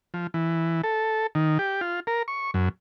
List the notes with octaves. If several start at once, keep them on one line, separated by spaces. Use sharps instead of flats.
F3
E3
A4
D#3
G4
F4
A#4
C#6
F#2